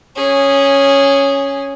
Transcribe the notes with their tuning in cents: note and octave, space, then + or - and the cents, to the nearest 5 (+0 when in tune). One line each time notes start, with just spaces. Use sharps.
C#4 +0 G#4 -10